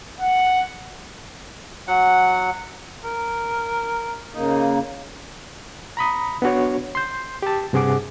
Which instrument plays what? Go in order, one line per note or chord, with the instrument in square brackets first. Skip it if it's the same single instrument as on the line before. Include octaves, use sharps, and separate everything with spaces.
[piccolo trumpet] F#5
[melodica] F#3 F#5
[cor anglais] A#4
[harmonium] C#3 A#3 [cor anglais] D#4
[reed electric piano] A#5 B5 D#6
B3 D4 F#4 C#5
C6 G6
G4 A5
G2 C3 G#4 F#5 D6